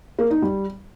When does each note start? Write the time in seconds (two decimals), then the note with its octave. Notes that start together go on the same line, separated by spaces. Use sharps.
0.19 A#3
0.30 D#4
0.42 G3